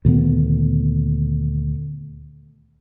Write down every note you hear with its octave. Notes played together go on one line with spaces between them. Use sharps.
D2 A#2 D#3 B3